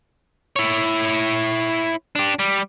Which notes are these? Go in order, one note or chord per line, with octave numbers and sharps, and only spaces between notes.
E4 C#5
D4 G4
G3